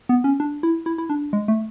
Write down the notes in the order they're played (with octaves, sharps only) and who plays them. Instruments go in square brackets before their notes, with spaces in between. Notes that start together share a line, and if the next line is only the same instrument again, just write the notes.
[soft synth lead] B3
C#4
D4
E4
E4
E4
D4
G#3
A3